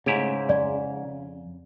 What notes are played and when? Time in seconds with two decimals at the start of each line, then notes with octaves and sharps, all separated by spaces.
0.06 G#2 C#3 A3 E4 G4
0.49 F2 D5